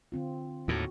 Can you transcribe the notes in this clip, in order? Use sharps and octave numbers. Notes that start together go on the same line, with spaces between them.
D3 C4 F4
D#2 A2 F#4